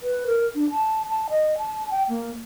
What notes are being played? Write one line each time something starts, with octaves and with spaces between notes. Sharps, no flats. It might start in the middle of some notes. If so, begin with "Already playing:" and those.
B4
A#4
D4
A5
A5
D#5
A5
G5
A#3